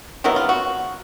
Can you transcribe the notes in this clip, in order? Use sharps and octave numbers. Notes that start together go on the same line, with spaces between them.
C3 D#3 F#3 B3 E4
F4
F#4